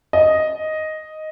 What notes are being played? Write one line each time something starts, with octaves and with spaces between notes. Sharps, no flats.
D#5